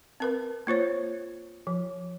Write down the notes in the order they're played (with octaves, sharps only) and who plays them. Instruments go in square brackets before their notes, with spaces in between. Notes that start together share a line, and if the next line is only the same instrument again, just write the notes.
[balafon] C4 A#4 B4
A#3 F4 C5 C#5
F3